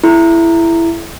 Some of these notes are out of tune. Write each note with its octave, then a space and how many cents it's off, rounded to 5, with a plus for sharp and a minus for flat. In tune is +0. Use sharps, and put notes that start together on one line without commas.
E4 +15 A4 -45